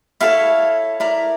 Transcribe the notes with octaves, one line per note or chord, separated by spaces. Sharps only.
E4 A4 C#5 F5
E4 A#4 D5